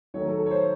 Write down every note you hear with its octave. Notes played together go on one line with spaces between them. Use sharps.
D#3 F#3 A3 C#5
A4
A4
C#5
C5